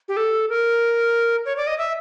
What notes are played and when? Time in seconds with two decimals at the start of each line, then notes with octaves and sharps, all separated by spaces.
0.08 G4
0.17 A4
0.49 A#4
1.45 C#5
1.57 D5
1.67 D#5
1.78 E5